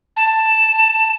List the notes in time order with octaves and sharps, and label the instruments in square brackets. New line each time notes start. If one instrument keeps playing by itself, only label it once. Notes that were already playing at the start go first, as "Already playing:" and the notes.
[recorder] A5